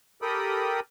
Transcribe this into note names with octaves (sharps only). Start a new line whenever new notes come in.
G4 A4 A#4 G5 B5 D#6